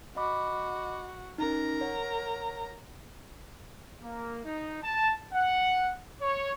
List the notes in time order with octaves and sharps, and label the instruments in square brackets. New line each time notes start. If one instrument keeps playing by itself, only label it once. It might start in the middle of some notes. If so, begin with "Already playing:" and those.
[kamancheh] F#4 [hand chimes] D#5 B5 D6
[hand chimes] C#4 D#4 [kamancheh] A#4 A#5
[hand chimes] C#5 F#5
[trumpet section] A#3
D#4
A5
F#5
C#5